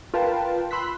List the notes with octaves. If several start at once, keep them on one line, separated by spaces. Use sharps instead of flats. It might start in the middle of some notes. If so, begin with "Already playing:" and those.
F4 A#4 B4 F5 G5 A5
B5 C6 E6 F#6 B6